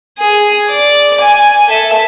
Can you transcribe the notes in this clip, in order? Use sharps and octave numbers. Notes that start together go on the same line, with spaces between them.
G#4
D5
G#5
A4 E5